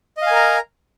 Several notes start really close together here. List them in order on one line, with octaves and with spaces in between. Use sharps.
D#5 F5 G#5 A#4 A#5